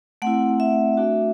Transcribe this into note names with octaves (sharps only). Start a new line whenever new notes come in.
A3 C4 E4 F#5
E5
A3 D4 F#4